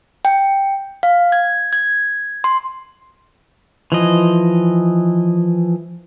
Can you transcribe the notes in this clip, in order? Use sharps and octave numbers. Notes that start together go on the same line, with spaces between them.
G5
F5
G#6
G#6
C6
E3 F3 D#5